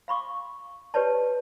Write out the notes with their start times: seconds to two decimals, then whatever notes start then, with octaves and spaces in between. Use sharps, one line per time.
0.08 F5 B5 C#6 D6
0.94 G4 B4 C#5 D5 A5